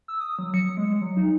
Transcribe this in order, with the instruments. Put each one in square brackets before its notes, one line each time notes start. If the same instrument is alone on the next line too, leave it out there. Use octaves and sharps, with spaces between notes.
[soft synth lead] E6
D#6
F#3
C#7
G#3
F#3
D#4